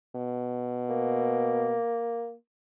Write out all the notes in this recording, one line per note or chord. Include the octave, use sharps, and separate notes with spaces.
B2
A#3